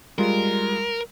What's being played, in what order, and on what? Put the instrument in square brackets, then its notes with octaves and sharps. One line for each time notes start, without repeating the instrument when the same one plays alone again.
[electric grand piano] G3 G#3 F4 [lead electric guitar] A#4